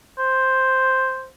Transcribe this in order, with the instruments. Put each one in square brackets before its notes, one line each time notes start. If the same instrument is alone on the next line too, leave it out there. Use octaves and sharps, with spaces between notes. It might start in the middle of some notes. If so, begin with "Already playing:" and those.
[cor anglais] C5